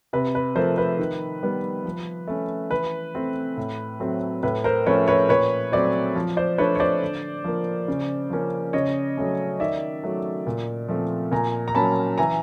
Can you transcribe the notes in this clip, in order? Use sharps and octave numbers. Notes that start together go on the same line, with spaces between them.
C3 B4
B4
F3 A3 A#4 C5
B4
D#3
G3 B3
F3
A3 C#4
E3 B4
A3 C4
A2
F#3 A3 C4
A2 B4
A#4 C5
F3 A3 C#4 B4 C#5
B4 C#5
A#2 B4 C#5
F#3 A3 C4 C5 D5
F3
C5 D5
A3 D4 B4 C#5
C#5
C5 D5
D3
F3 A#3
C#3
F3 A#3 C#4
C#3 C#5 D#5
F#3 A3 C#4
D#3 D5 E5
F#3 A3
A#2
F3 A3 C4
A#2 G#5 A#5
A#5
F#3 A#3 C#4 A5 B5
E3 G#5 A#5